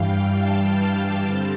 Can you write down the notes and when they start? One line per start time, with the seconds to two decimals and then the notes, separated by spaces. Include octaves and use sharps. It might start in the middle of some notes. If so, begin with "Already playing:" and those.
Already playing: G2 E3 G3 F5 G5
0.33 A5
1.20 D3 G3 C4